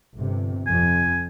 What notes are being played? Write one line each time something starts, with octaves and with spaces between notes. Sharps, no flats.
G1 C3
F2 G#5